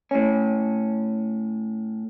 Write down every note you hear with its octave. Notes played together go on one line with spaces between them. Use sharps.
A2 C#4